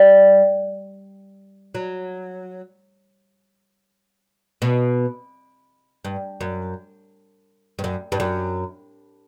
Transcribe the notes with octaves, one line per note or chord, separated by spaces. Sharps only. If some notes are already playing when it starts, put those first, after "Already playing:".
Already playing: G3
F#3
B2
G2
F#2
G2
F#2
G2
F#2